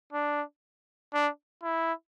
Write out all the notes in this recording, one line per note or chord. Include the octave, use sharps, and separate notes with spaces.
D4
D4
E4